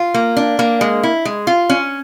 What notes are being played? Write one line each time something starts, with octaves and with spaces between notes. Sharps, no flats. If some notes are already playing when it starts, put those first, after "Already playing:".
Already playing: F4
A#3
D4
A#3
G#3
E4
G#3
F4
C#4